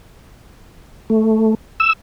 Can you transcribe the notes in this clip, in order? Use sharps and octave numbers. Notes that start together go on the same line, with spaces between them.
A3
E6